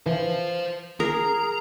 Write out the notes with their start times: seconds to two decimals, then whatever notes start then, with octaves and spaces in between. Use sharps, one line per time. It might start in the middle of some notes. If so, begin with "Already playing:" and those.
0.06 E3 C5 F5
1.00 G#4 A#4 A#5